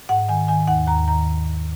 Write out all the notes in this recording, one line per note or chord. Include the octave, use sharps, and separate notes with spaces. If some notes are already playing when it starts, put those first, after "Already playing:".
G#2 F#5
D#3 G#5
D#3 G#5
D#2 F#5
D#2 A#5
D#3 A#5